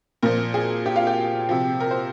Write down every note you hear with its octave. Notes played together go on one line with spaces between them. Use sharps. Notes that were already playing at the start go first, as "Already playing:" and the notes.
A#2 F3 A#4
G#4
G4
F4
G4
C3 F3
A#4
C5